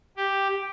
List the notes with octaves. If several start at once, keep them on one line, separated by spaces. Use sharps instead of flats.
G4